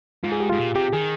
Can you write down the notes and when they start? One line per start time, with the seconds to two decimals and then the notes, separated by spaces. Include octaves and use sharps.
0.23 G#2 F4
0.32 G#4
0.40 G4
0.50 G#2 F4
0.58 A#2
0.75 C3 G4
0.93 D#3 G#4